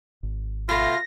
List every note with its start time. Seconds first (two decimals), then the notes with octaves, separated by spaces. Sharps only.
0.23 G#1
0.69 B2 A3 F4 A#6